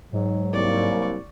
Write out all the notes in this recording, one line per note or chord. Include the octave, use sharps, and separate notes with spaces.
G#2 F#3
C2 A#3 D5 C#6